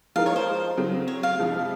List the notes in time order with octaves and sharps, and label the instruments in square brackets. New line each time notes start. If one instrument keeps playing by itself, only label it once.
[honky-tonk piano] F3 G#3 D#4 A#4 [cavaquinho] F5
[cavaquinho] C#5
C5
[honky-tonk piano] C#3 F#3 C4
[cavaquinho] C#5
F5
[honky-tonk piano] F2 C3 F3 G#3